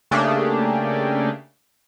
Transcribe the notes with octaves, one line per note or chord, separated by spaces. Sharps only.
C#3 A3 A#3 D4 G4 G#4